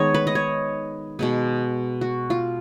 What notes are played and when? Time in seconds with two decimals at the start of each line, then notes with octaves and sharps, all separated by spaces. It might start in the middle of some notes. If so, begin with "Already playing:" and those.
Already playing: D#3 G#3 B3 C#5 D#5
0.14 B4
0.27 D#5
0.35 C#5
1.19 B2 G#3 B3
2.01 F#4
2.30 F4